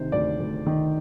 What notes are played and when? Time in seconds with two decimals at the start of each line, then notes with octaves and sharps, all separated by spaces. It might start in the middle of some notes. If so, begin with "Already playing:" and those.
Already playing: D2 C3 D#3 C5
0.12 D2 D5
0.40 D2
0.66 D#3